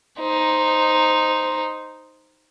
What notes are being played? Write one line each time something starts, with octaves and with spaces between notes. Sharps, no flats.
D#4 C5